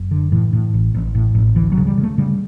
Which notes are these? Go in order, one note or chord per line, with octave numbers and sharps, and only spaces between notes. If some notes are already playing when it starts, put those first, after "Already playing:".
Already playing: F#1
D3
A2 E3
A2
A1
A1
A2
A1
D2 E3
F#3
C#3
G3
C#3
A3
C#3 G3